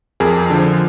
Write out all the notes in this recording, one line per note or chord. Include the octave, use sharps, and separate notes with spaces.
F2 G#4 A#4
D3 F3